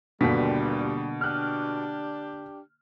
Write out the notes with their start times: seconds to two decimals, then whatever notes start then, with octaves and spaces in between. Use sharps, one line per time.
0.21 G1 D#2 B2 D3 G3 A#3 B6
1.21 D4 G4 F6 F#6